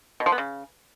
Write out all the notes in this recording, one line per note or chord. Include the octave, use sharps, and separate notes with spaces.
B2
F3
B3
C#3